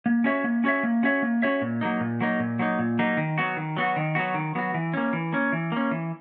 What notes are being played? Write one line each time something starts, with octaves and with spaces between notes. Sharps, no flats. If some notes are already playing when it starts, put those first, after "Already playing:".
A#3
C#4 F#4 C#5 E5
A#3
C#4 F#4 C#5 E5
A#3
C#4 F#4 C#5 E5
A#3
C#4 F#4 C#5 E5
A#2
F#3 A#3 D#4
A#2
F#3 A#3 D#4
A#2
F#3 A#3 D#4
A#2
F#3 A#3 D#4
D#3
F#3 B3 F#4
D#3
F#3 B3 F#4
D#3
F#3 B3 F#4
D#3
F#3 B3 F#4
E3
A#3 C#4
E3
A#3 C#4
E3
A#3 C#4
E3